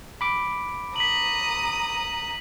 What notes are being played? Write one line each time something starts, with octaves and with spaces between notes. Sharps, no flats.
B5 D6
A#5 D#6 B6 F#7